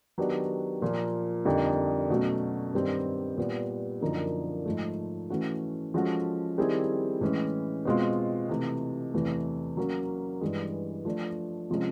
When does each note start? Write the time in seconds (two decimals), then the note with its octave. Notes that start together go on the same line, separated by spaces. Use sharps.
0.18 D#3 F#3 B3 D4 G4
0.82 A#2 F3 A#3
1.45 F2 D3 G3 A#3 D#4
2.10 B2 F#3 A3 C#4
2.74 G2 D#3 G3 C4
3.37 A#2 G3 B3
4.01 F#2 D3 F3 A#3 D#4
4.65 G#2 F3 A3
5.30 E3 A3 C#4 F#4
5.94 F3 G#3 C#4 F#4 A4
6.58 D#3 G3 C4 E4 G#4
7.21 A2 E3 G#3 C#4
7.85 B2 G#3 C4 F4
8.49 C3 E3 A3
9.13 E2 C3 E3 A3
9.77 F#3 A#3 C#4
10.41 G2 E3 G#3
11.05 F3 A3 D4
11.70 C3 F3 G#3 C#4